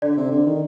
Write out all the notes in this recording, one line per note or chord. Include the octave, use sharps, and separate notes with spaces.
D3 D5
C3
D3
D#3